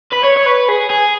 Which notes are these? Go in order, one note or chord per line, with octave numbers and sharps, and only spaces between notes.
B4
C#5
C#5
B4
G#4
G#4